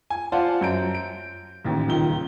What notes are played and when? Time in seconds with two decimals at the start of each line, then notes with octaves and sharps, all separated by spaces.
0.10 G#5
0.32 F4 C5 D5 F5 F#5 A5
0.61 F#2 G6 D7
0.95 D7
1.64 A1 D#2
1.87 D#1 C#2 D#3 G7